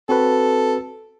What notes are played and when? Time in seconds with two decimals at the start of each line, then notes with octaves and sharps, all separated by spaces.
0.09 C4 F#4 A4 B4